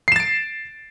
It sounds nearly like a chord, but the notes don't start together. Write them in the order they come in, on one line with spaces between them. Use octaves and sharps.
C7 E7 A6 D7